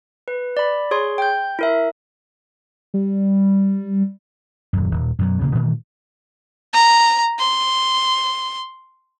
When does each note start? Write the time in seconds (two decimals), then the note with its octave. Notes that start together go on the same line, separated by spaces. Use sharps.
0.28 B4
0.57 D5 B5
0.91 G#4 C#5 C6
1.18 G5 G6
1.59 E4 A#4 E5
2.94 G3
4.73 D#1 F#2
4.91 D#1
5.19 F#2 B2 F#3
5.41 D#1 C#3 A#3
5.55 A#2 D#3 E3 A3
6.73 A#5
7.39 C6